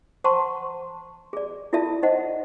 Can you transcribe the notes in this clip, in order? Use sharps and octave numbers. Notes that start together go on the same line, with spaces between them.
C5 F#5 A5 A#5 C6 C#6
G#4 D5
E4 F4 A4 D5 E5 A5
D#4 C5 D#5 F#5